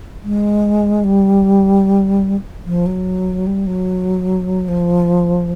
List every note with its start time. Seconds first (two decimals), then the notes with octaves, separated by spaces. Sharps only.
0.24 G#3
1.04 G3
2.66 F3
2.86 F#3
3.47 G3
3.66 F#3
4.68 F3